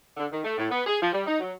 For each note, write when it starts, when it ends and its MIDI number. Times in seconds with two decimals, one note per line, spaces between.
0.17 0.26 50
0.31 0.42 51
0.44 0.52 57
0.57 0.69 45
0.71 0.82 59
0.86 0.96 68
1.02 1.09 53
1.13 1.25 55
1.26 1.40 63
1.40 1.52 54